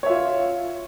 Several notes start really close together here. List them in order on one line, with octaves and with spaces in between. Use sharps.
C#5 E5 F4